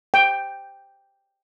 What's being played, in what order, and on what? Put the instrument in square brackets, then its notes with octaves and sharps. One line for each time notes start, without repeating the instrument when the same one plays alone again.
[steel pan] G5